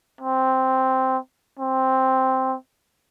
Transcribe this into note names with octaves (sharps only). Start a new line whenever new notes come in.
C4
C4